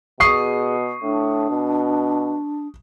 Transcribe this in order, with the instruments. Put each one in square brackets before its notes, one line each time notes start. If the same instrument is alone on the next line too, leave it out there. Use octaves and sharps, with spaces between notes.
[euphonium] B2 [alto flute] G#4 [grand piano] C#6 D#6 C7
[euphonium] A2 [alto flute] D4
[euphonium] B2